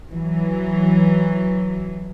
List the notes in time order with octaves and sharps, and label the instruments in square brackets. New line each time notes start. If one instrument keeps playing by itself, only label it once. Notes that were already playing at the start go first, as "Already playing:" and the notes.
[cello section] E3 F#3